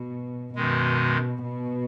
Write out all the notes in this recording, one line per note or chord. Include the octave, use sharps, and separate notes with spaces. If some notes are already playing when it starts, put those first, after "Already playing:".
Already playing: B2
F#2 B2 D#3 G#3
B2